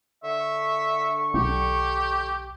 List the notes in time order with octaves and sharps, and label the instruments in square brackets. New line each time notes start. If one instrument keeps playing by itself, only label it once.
[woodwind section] D3 C#6 [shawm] E5
[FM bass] B1 [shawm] G4